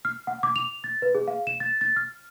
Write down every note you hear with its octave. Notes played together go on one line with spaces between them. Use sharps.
F6
F#5
D6
F7
A6
B4
G#4
F5
E7
A6
A6
F6